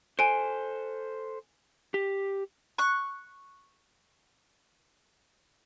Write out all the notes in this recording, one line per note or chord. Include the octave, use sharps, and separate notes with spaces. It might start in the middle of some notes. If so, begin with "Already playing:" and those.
A4 C5 G#5 D7
G4
C#6 F#6